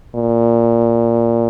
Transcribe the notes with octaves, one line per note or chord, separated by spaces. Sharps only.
A#2